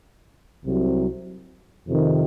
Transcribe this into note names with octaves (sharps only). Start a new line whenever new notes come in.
C2 C3 F#3
F2 C3 D#3